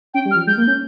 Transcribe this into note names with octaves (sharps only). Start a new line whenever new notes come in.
C#4 G5
G3
F6
F3
G#3 G6
A#3
C#4